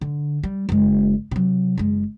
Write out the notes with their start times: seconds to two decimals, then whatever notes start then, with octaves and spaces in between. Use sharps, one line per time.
0.01 D3
0.43 G3
0.69 F#1 G#3
1.31 C3 F#3
1.78 F#1 G#3